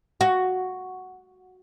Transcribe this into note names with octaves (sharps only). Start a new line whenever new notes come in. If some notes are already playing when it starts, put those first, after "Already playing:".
F#4